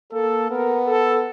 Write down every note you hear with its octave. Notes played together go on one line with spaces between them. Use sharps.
A#3 A4
B3 A#4
A4